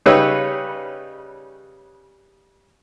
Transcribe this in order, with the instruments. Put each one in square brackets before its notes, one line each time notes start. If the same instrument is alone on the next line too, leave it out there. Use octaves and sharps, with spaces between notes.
[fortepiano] C#3 G3 D#4 B4 C#5 E6